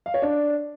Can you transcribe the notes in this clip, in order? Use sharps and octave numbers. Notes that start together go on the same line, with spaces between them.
F5
C#5
D4